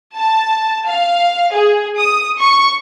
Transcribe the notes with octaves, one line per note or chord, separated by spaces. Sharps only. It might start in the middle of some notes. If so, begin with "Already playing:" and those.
A5
F5
G#4
D#6
C#6